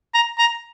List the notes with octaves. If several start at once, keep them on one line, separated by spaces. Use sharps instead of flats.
A#5
A#5